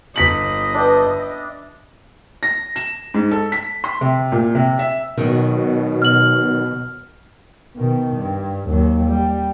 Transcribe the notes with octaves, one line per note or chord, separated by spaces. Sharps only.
G1 D#5 B6 F#7
D4 B4 E5 G5
A#6
E7
G#2
A4
B6
C6
C3
A#2
C3
E5
B2 D#3 F#3
F6 F#7
B2 D#3
G2
D#2 F#3
G3